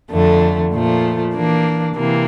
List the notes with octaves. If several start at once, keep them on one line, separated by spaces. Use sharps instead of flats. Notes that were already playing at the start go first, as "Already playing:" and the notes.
F2 D3 A3
A#2 F3 A3
E3 A#3 D4
C3 E3 A#3